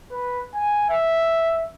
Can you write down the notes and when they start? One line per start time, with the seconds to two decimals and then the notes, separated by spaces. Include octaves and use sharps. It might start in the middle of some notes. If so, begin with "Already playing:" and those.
0.11 B4
0.54 G#5
0.90 E5